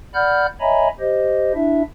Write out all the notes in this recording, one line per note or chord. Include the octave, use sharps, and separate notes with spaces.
D5 F#5 B5 F6 G6
C#5 D#5 E5 G#5 A#5 B5
G4 C5 D#5
D4 E4 E5